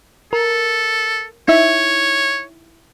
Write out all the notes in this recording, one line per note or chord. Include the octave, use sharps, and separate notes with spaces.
A4 A#4
D#4 E4 C#5 E5